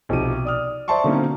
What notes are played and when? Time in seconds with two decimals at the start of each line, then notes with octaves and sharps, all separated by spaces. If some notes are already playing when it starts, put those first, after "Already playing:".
0.09 B1 C3 F3 D#4 D6 D#7
0.45 D5 D#6 F6
0.88 C5 D5 E5 A5 C6 C#6
1.04 D3 F#3 A#3 C4 C#4 D#4